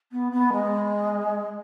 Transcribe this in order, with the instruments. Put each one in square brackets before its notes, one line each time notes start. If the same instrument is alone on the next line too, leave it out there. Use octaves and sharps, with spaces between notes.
[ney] B3
B3
G#3